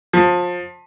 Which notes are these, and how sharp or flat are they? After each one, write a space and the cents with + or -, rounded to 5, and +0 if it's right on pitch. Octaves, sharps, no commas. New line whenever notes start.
F3 +25